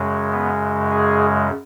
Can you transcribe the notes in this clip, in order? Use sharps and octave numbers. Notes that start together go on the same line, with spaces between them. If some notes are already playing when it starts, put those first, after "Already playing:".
Already playing: F#2 C#3 G#3
B3
G#4